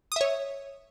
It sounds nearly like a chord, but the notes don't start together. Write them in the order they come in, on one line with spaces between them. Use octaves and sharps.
D#6 E5 C#5